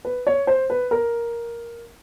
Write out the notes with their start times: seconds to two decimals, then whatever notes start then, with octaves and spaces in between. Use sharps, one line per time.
0.05 B4
0.27 C#5
0.47 C5
0.70 B4
0.91 A#4